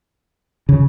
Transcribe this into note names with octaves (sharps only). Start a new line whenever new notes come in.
C#3